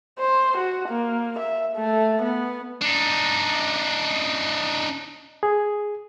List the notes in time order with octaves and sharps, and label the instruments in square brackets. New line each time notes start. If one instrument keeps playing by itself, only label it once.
[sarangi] C5
F#4
A#3
E5
A3
B3
[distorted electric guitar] D4 D#4
[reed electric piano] G#4